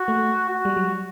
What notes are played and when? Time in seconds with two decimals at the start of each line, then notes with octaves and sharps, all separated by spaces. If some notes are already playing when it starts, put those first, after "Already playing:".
Already playing: F#4
0.08 A3
0.49 F#4
0.65 G3
0.77 F#3